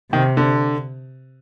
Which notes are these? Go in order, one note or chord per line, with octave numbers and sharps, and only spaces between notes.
C3 D#3
D3